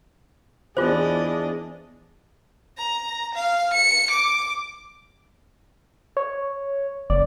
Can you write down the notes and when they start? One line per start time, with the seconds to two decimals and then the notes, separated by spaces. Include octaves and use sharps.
0.77 E2 D4 F4 G#4 C5 D#5
2.78 A#5
3.35 F5
3.73 C#7
4.10 D6
6.17 C#5
7.10 F#1 D5